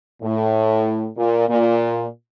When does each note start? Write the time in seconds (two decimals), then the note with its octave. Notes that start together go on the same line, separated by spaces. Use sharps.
0.23 A2
1.17 A#2
1.49 A#2